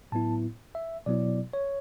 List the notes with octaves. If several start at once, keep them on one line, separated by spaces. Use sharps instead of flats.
A2 F#3 B3 E4 A5
E5
B2 F#3 B3 E4 D5
C#5